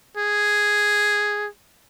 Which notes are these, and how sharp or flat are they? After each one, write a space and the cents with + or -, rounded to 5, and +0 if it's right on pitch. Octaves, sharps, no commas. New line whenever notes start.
G#4 +0